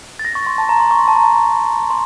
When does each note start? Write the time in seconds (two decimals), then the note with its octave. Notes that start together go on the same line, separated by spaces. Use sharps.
0.19 A6
0.25 A#6
0.35 C#6
0.47 C6
0.58 A5
0.69 A#5
0.80 C6
0.91 C#6
0.99 C6
1.08 A5
1.16 A#5
1.90 C6